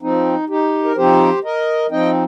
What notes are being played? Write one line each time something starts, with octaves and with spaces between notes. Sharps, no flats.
F3 C4 D#4
D#4 G4
A#4
F3 C4 D#4 G4 C5
A#4 D#5
F3 C4 D#4 D#5 G5